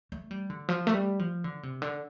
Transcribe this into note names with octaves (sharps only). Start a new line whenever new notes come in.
A3
G3
D3
F3
A3
G3
F3
D3
C3
D3